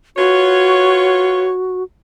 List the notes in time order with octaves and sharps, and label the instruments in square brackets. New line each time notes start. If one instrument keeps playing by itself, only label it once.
[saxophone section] F4 B4 C#5 [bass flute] F#4